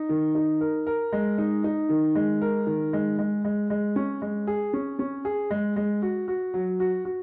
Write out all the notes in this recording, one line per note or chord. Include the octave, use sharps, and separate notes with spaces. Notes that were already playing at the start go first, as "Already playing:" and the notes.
Already playing: D#4
D#3
D#4
A#4
A#4
G#3
D#4
D#4
D#3
G#3
A#4
D#3
G#3
G#3
G#3
G#3
C#4
G#3
G#4
C#4
C#4
G#4
G#3
G#3
F#4
F#4
F#3
F#4
F#4